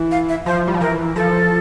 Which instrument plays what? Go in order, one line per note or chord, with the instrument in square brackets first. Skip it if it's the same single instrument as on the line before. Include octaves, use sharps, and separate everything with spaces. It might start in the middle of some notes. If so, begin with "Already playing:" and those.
Already playing: [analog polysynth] E3
[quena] F5
E5
[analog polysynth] F3 [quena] C5
[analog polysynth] G3
F3
[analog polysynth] E3 [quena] A#4
[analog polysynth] F3 [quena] A4